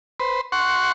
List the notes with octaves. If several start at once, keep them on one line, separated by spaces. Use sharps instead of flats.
B4 C5
F#5 C6 C#6